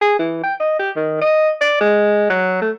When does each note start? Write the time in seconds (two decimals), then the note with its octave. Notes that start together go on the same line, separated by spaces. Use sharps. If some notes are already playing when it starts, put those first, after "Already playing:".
0.01 G#4
0.19 E3
0.43 G5
0.60 D#5
0.79 G4
0.96 D#3
1.21 D#5
1.61 D5
1.81 G#3
2.30 F#3
2.62 A3